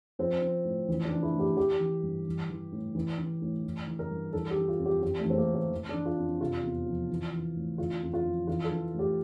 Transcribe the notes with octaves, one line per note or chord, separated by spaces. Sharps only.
F3 C4
F3
A2
E3
D4
E3
E4
A2
G4
E3 G4
E3
G2
E3
E3
A2
E3
E3
A2
E3
E3
A#4
G2
E3 A4
G4
E3
F4
F2
G4
E3 G4
A3
E3
C4
A#3
A2
C4
E3
E3 D4
F4
F2
C3 F4
E2
F3
E3
E3
A2
D3 F4
F2
F4
F3
E3 F4
A4
E3
A2 G4